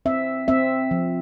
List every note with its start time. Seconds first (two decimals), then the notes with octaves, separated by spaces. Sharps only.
0.05 C4 E5
0.48 C4 E5
0.91 F3